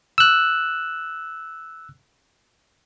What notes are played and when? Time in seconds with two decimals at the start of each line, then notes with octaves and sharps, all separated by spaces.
0.18 E6 F#6